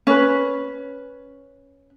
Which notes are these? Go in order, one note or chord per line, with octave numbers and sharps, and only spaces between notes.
C#4 B4